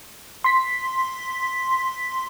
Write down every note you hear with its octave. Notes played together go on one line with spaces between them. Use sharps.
C6 B6